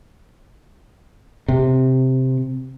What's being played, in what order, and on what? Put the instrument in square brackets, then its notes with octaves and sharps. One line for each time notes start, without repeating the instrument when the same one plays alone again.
[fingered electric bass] C3